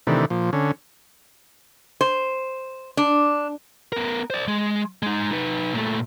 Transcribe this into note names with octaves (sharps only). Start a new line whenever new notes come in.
C3 D#3 E3 A3 D4
A#2 F3
D3 C#4
C5
D4
B3 A#4
C5 D5
G#3
G#3 D#4
D#4 B4
A#2 A3